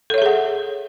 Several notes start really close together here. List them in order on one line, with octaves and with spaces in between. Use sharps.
A4 C#5 E5 G#4 F#5